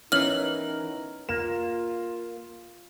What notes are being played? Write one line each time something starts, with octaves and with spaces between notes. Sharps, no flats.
E3 B3 C#4 D#4 A#4 F6 F#7
A#3 F4 E7